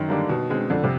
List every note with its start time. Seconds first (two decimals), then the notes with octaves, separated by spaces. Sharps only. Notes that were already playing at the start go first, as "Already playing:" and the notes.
Already playing: F#2 D#3
0.08 D3 G3 A#3 D4
0.29 B2
0.50 G#3 C4
0.70 F2 D3
0.84 C3